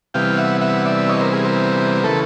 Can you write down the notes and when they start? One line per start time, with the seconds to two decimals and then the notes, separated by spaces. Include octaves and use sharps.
0.14 C3 E3 G3 B3 F5 G5
0.37 E5 F#5
0.61 E5 F#5
0.85 D5 E5
1.09 C#5 D#5
1.20 A#4 C5
1.33 G#4 A#4
1.44 A#4 C5
2.03 C#3 E3 A3 A4 B4